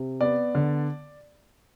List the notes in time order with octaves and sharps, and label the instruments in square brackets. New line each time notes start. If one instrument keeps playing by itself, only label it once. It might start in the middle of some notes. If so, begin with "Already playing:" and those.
Already playing: [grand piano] C3
B3 D5
D3